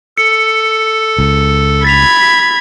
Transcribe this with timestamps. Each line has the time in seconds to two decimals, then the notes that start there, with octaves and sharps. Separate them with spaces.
0.18 A4 C#7
1.19 C#2
1.84 B5 G#6 A6 B6 F7